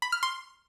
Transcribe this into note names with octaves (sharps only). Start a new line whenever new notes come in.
B5
F6
C6